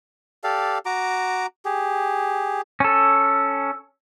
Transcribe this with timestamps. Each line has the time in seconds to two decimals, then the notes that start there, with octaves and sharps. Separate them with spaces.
0.44 G4 A4 D5 F5
0.86 F#4 A#5 D6
1.65 G4 G#4
2.80 C#4 A4